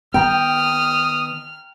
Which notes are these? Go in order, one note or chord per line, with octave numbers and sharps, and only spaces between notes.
D#3 B3 G5 A#5 D#6 F6